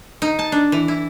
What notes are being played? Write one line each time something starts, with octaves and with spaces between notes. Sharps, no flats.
D#4
A5
D4
E3
E4